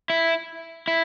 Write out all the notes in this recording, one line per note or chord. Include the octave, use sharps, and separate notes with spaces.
E4
E4